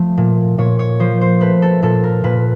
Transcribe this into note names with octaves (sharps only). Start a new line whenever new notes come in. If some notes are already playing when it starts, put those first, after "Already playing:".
Already playing: F3 A3
A#2
A#2 C#5
C#5
F3 C5
C5
A3 B4
A4
A#2 A4
A#4
A#2 B4